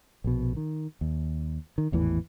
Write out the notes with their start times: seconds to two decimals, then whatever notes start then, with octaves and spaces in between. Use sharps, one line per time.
0.24 A#1 B2
0.57 D#3
1.01 D#2
1.78 D#3
1.92 G#1 E2 A2 E3